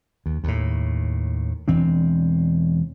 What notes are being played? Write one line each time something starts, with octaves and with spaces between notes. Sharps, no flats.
D#2
D#2 A2
E1 E3 C4 D4